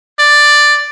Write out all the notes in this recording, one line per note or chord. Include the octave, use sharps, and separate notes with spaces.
D5